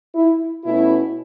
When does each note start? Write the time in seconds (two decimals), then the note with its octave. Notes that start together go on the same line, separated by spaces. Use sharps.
0.15 E4
0.65 B2 A3 C#4 E4